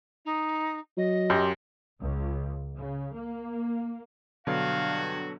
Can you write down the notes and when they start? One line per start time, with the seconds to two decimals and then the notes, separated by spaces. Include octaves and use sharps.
0.25 D#4
0.97 F#3 D#5
1.30 F#2 G4 C6 G6
2.01 C#2
2.79 C#3
3.14 A#3
4.47 G2 B2 D3 F#3 F#4 F5